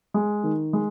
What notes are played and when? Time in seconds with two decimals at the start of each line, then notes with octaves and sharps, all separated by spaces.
0.14 G#3
0.44 D#3
0.73 G#3